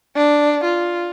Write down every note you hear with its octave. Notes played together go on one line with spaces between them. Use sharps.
D4
F4